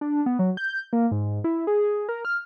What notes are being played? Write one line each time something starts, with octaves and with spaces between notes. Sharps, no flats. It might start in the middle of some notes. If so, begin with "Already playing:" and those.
D4
B3
F#3
G6
A#3
G#2
E4
G#4
A#4
F6